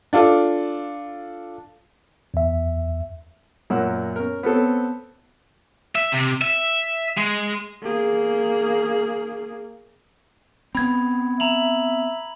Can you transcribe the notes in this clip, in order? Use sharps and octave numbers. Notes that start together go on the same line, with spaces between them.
D4 F4 A4
E2 E5
F#2 A#2 A#4 C#5 F#5 E6
C#4 A#4
B3 C4 A4 C#5
E5
C3
E5
G#3
A#3 G#4
B3 C4 B5 G#6
E5 A#5 F7 F#7